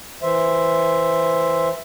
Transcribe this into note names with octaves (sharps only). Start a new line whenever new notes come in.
E3 C5 E5